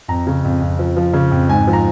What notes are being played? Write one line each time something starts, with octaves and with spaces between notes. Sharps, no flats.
F2 A#5
C#3
F2
F2
F3
F3
C#3
F2
G#2 G#5
F3
A#5